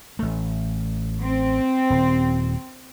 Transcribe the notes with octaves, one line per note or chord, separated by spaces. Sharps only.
A1 A3
C4
D#1